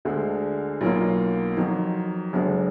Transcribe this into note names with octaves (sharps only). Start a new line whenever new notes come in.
D2 D3 G#3
B1 B2 F#3 A#3 F4
F2 D#3 F#3
F#1 F#2 D3 G#3 D4